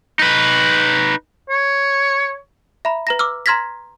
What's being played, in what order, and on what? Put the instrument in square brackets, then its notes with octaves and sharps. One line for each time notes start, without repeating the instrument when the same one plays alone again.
[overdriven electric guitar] D#4 B4
[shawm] C#5
[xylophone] E5 A#5 B5
B4 A#5 A#6
D6 E6 F6
A#5 C6 F6 G#6 A#6 B6